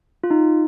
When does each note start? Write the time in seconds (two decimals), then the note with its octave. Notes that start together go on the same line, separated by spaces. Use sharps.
0.24 F4
0.30 D#4